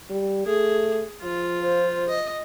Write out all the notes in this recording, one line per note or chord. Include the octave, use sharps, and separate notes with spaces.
G3
A3 G#4
F3 F4
C5
D#5